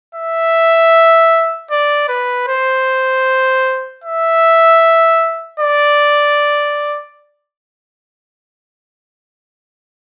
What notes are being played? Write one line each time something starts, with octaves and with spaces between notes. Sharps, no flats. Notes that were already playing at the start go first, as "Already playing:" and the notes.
E5
D5
B4
C5
E5
D5